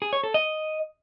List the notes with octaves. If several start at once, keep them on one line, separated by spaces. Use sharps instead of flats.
G#4
C#5
A4
D#5